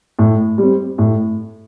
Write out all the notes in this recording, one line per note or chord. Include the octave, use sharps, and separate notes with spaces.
A2
G3
C4
A2